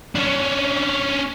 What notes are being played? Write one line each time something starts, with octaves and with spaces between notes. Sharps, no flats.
C#4 D4